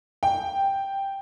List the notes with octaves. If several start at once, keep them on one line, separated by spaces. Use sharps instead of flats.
G5